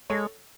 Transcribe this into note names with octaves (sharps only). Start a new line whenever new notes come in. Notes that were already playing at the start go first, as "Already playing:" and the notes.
G#3 A4 C#5